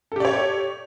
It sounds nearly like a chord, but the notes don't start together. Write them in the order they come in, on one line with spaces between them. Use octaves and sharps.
A4 G4 D5 C#5